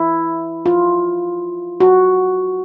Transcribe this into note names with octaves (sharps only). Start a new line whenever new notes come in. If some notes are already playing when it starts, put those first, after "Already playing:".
Already playing: E4
F4
F#4